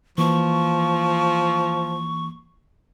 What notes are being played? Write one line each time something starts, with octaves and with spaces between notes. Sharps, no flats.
E3 F3 A#3 C#6